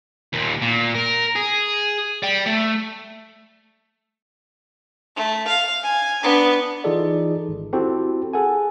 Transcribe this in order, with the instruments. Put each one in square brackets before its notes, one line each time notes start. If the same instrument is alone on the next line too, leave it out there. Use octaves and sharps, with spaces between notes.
[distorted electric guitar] D#2 A#2
A#2
A#4
G#4
D5 G5
A3
[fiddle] A3
F5
G#5
B3 D4
[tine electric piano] E3 D#4 F4 G#4 A4 D5
G#1
C4 E4 F#4 G4 A4
G#4 A4 F#5 G#5